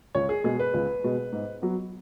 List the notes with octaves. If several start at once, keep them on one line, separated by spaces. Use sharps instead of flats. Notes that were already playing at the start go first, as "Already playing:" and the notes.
C#2 C#5
G#4
B2 G#3 G#4
B4
C#2
B2 G#3
G#2
F#3 B3